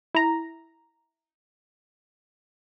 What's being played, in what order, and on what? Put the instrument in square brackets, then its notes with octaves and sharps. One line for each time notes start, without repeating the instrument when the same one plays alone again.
[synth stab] E4 A#5